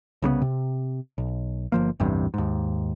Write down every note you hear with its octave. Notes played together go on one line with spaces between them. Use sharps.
C2 C#3 G3 B3
C3
B1
G1 F3 A#3
A1 E2 G2 C3
D#2 G#2